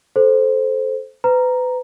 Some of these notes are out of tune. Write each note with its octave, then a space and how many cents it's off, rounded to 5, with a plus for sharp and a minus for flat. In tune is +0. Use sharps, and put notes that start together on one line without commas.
A4 -15 C5 +0
B4 +35 A#5 +0